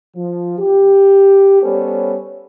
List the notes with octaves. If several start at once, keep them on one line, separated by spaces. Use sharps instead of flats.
F3
G4
G3 B3 C#4 A4 C5 C#5